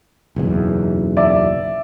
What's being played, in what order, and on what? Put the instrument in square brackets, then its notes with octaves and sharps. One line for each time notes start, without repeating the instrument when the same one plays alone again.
[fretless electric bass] F#1 B1 E2
[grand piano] D5 E5 D6